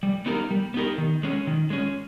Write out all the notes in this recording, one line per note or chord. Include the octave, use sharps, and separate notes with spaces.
G3
B3 D#4 G4 A#4
G3
B3 D#4 G4 A#4
D#3
G#3 C#4
D#3
G#3 C#4